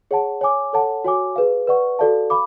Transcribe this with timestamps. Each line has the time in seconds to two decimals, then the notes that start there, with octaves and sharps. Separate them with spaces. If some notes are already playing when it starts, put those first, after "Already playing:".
0.11 G#4 C#5 F#5 A5
0.41 C#5 G#5 D6
0.73 A4 C#5 F#5 A5
1.04 F#4 C#5 G#5 D6
1.36 G#4 B4 F5
1.67 B4 D5 F#5 C#6
1.99 F#4 A4 D5 F5 A5
2.30 F5 B5 D6